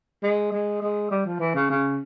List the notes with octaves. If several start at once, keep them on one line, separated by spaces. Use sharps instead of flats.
G#3
G#3
G#3
G3
F3
E3
C#3
C#3